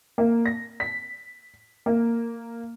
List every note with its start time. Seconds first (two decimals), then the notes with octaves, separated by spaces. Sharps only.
0.18 A#3
0.46 A#6
0.80 B6
1.86 A#3